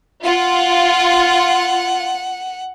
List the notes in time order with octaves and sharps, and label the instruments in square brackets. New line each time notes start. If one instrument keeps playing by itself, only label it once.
[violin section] F4 [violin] F#5